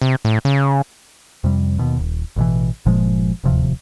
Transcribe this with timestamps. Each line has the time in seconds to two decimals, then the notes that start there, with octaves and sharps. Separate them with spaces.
0.02 C3
0.25 A2
0.45 C#3
1.44 F2 C3 G3
1.79 D#2 B2
1.99 D#1
2.36 A1 B2 E3
2.86 G1 A#2 F3 G#3
3.44 D1 D#2 C3 F3